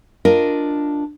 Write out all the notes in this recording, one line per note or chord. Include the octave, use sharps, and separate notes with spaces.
D4 F4 A#4 D#5